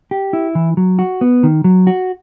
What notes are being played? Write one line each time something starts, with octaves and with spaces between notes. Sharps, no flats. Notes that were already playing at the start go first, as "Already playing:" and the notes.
G4
E4
E3
F#3
F#4
B3
D#3
F#3
F#4